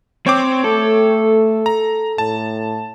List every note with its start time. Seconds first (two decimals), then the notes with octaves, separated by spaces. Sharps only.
0.26 C4 C#5 G5 D6
0.64 A3 A4
1.66 A#5
2.18 A2 A5